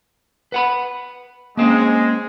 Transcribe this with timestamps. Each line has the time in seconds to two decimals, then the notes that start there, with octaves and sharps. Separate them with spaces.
0.52 B4 F#5 B5
1.57 G#3 A#3 C4 C#4